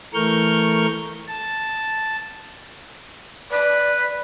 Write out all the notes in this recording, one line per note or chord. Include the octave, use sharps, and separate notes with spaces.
E3 A3 A#4 C#6 F6 G6
A5
B4 D5